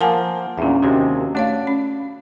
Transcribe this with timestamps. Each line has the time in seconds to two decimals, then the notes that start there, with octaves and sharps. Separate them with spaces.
0.01 F3 A#3 A#4 F#5 G#5 A5
0.58 E2 A#2 C#4 D4 E5
0.82 D#2 C3 G#3 F#4
1.35 A3 D4 C#5 F5
1.67 C#4